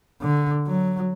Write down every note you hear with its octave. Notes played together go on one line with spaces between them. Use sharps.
D3
F#3